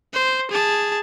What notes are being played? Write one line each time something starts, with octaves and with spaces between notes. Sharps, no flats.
C5
G#4 A5